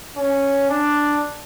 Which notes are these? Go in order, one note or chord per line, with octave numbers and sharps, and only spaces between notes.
C#4
D4